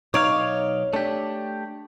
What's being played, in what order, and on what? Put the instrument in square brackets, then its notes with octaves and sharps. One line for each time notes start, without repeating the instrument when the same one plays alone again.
[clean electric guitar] B1 D5 F5 [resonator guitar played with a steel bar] D#4 [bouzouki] C#5
[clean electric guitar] A3 G4 [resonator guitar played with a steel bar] D4